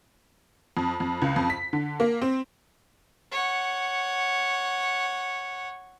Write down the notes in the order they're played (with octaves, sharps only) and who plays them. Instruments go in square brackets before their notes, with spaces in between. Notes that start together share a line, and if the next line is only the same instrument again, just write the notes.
[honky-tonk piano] F2
F2
C#2
F2
B6
D3
A#3
C4
[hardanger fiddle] C#5 F#5